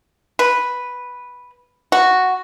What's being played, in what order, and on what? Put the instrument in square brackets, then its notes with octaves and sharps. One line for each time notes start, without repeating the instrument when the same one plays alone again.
[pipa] B4
F#4